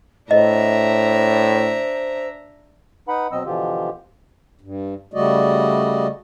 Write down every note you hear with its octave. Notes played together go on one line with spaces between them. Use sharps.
A2 D4 C5 D#5 E5 A#5
D#4 B4 F#5 B5
B2 F#3 C4 D#5 E6
B2 D3 E3 F3 F4 G4
G2
C#3 G3 A3 F#4 D5 D#5